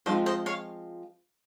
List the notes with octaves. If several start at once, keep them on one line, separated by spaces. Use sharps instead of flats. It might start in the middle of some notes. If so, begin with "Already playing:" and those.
F3 G#3 C4 F4 C5
C5 D#5
C#5 F5